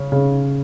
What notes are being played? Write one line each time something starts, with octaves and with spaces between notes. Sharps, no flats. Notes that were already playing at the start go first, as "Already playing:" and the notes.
Already playing: C#3 C#4
C#3